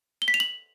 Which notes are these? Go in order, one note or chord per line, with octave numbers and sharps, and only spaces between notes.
G7
B6
F7
F#7